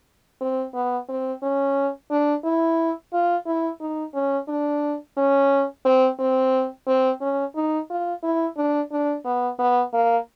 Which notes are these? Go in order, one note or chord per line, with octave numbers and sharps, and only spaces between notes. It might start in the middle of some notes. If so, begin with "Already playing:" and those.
C4
B3
C4
C#4
D4
E4
F4
E4
D#4
C#4
D4
C#4
C4
C4
C4
C#4
D#4
F4
E4
D4
D4
B3
B3
A#3